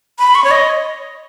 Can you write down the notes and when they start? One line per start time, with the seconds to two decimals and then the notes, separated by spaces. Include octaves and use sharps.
0.19 B5
0.35 C#6
0.44 C#5
0.51 D#5